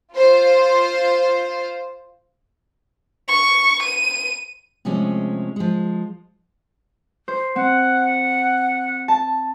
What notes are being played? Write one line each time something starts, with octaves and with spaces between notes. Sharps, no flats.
F4 C5
C#6
D#7
C3 F3 G#3 A3 C#4
F3 G#3
C5
C4 F#5
A5